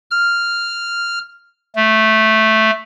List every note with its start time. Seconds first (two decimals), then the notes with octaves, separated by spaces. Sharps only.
0.11 F6
1.76 A3